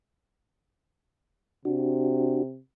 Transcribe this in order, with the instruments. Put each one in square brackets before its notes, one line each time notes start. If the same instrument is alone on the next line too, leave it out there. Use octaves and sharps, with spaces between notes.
[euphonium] C3 [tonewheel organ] D4 F#4